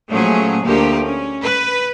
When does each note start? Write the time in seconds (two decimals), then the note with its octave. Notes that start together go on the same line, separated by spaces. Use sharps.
0.10 A#2 F3 F#3 A3 C#4 G#4
0.64 D2 F3 A3 A#3 G4 A#4
1.04 C#4
1.42 B4